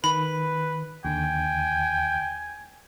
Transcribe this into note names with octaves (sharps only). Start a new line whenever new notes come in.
D#3 B4 B5
D#2 D3 G5 G#5